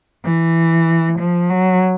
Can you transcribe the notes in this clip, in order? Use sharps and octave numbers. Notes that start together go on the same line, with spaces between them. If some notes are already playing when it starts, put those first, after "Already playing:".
E3
F3
F#3